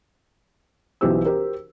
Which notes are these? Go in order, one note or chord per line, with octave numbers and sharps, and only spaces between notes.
B1 E3 B3 G4 C5 E6
G4 A#4 C5